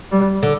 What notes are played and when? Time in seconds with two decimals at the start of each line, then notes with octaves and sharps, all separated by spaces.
0.12 G3
0.43 D3